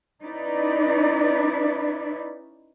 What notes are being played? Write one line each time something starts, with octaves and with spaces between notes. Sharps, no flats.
C#4 D#4 E4 B4 D5